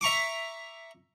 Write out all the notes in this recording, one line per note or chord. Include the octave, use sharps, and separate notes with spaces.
E5 A#5 C#6 D6